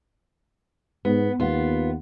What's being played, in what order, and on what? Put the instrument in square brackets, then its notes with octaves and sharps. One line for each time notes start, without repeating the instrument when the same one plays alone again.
[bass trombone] G#2 [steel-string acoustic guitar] B3
[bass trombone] D#2 [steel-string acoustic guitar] B3 F4